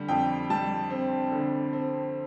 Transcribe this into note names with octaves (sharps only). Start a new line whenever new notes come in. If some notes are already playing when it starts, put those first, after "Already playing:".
Already playing: D3 G3
F2 G5
G3 A5
C4
D3
C4